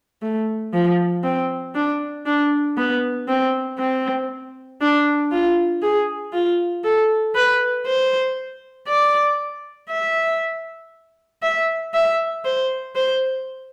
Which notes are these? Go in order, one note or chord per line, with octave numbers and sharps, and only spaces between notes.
A3
F3
C4
D4
D4
B3
C4
C4
D4
F4
G#4
F4
A4
B4
C5
D5
E5
E5
E5
C5
C5